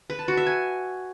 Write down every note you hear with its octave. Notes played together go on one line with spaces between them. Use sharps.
B4
A5
F#4
E5
G#5